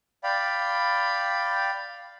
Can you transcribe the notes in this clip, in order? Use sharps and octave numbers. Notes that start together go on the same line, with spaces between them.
D5 F5 G5 B5